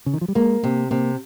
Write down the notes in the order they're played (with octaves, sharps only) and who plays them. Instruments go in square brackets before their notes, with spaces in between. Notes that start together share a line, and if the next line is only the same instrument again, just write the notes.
[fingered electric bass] C#3
D#3
F3
G3
[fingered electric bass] G#3 [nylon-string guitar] A#3
[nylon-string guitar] C3 [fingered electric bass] A#3
[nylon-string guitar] C3 [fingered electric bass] A#3